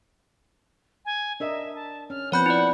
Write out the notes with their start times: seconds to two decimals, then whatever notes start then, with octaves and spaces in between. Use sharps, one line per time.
1.05 G#5
1.40 D4 A#4 D#5 E5
1.75 A5
2.10 C#4 F6
2.32 F3 B3 C4 C#5 F#5 B5 G6
2.46 E4 D5